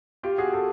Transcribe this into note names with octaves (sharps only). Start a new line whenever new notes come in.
F4 G4
F#4 G#4
G4 A4